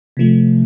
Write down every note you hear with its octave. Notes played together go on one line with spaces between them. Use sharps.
C3 F3 A3